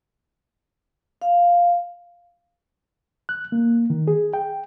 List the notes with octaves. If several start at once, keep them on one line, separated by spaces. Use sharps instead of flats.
F5
F#6
A#3
D#3
G#4
G5